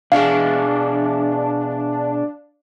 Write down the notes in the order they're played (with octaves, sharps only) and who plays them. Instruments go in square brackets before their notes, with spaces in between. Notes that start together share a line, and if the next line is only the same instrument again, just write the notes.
[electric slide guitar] B2 F#4 G#4 [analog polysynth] D4 [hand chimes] F5